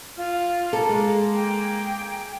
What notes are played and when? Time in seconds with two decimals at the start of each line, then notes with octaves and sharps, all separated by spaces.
0.17 F4 F6
0.73 A#3 A4
0.89 G#3 F5
1.36 G#4 G5